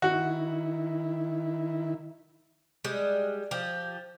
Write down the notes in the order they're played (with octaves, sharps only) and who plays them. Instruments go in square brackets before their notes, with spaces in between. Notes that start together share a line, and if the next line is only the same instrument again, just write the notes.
[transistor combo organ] D#3 E4 [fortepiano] F#4
[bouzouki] G3 G#3
F3 G4